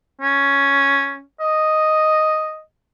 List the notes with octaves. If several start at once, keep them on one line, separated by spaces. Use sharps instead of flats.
C#4
D#5